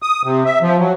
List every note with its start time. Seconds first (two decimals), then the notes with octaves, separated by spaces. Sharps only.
0.02 D#6
0.24 C3
0.45 E5
0.62 F3
0.79 F#3